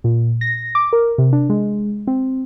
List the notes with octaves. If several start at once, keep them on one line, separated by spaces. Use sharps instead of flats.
A#2
A#6
D6
A#4
C3
D4
G#3
C4